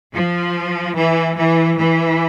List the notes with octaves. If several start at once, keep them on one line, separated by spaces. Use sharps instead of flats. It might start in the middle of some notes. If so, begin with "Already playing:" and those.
F3
E3
E3
E3